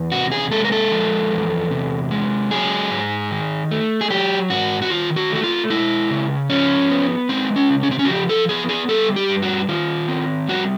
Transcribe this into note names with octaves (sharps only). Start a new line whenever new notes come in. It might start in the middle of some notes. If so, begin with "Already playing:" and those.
Already playing: E2
C3 F#4
G#4
G#3 A4
A#4
A4
F3
E2
C3
G#3
F#3 G#4
G#2
D#3
A3
G#4
F#3 G4
G#2 F#4
F#4
D#3 F4
F#4
A3
F#4
F4
G#3 E4
C#3
F3 C#4
B3
G#3 C4
C#4
C#3
C#4
C4
C#4
F#4
F3 G4
A4
B3 G#4
G#4
G3 A4
G4
G2
F#4
D#3 F4
C4
G3 F#4